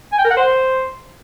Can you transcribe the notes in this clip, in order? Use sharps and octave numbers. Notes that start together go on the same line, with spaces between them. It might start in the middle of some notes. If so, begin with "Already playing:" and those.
G#5
G5
A#4
F#5
C5